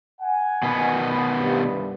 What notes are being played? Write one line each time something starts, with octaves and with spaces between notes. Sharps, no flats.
F#5 G#5
B2 D#3 B3
C2 G2